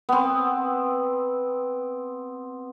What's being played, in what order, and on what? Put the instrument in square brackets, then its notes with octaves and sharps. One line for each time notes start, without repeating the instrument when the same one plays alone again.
[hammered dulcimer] B3 C4